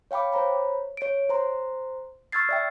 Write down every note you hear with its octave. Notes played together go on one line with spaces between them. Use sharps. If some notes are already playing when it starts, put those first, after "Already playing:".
C#5 F5 G5 B5 D6
C5 C#5 A#5 B5
C#5 D7
C5 A#5 C6
C#6 E6 F6 G#6 A6 C7
D5 E5 G5